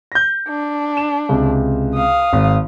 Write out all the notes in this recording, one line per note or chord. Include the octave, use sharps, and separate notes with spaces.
G6 A#6
D4
E7
C#2 C3
F5 D#6
G#1